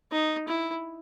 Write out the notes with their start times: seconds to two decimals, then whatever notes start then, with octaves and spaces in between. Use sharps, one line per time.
0.12 D#4
0.48 E4